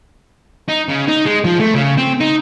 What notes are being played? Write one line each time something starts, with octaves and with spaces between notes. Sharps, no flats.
D#4
C#3
D#4
G#3
F3
A3
C#3
C4
D#4